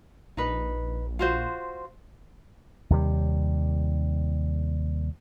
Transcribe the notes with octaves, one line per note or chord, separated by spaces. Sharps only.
A#1 D#4 B4
F4 F#4 C5
D#2 C3 G3